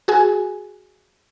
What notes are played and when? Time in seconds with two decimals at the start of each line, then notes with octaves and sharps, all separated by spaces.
0.08 F#4 G#4 G#5